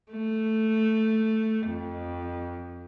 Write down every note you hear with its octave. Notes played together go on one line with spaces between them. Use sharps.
A3
F2